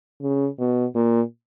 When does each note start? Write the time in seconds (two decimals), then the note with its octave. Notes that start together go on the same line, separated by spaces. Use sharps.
0.22 C#3
0.59 B2
0.95 A#2